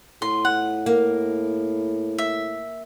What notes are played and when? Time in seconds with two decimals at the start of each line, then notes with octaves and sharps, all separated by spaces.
0.22 A2 B3 F4 C6
0.45 F#5
0.86 A#3
2.18 E5